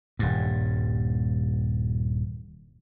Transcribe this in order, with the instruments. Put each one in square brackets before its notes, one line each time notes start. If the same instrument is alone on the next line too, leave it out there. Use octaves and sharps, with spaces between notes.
[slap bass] D#1 G2